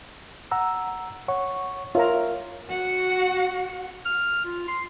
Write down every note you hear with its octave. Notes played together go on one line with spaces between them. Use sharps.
F#5 A#5 E6
C#5 F#5 C#6
F4 A#4 C#5 E5 A#5
F#4 F#5
F6
F4
C6